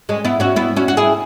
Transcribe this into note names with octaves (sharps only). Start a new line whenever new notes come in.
G#3 C#4
B3 E4
C#4 F#4
B3 E4
C#4 F#4
F#4
E4 G#4